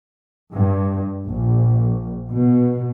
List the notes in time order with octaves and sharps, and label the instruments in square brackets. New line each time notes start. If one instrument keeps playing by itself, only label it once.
[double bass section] G2
A#1
B2